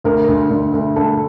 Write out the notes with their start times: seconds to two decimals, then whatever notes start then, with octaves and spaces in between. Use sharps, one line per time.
0.04 D2 A#4
0.28 D2
0.50 D2
0.73 D2
0.96 D2 A4